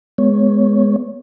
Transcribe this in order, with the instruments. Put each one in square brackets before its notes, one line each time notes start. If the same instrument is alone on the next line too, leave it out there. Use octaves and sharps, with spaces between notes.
[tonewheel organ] G#3 B3 C#5